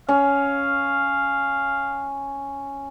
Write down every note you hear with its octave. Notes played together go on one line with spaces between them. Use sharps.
C#4 F5